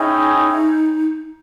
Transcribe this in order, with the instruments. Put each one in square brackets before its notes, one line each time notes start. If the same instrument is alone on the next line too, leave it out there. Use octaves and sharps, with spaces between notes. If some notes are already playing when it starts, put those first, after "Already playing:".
Already playing: [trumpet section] C#4 E4 G#4 D#5 G5 [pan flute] D#4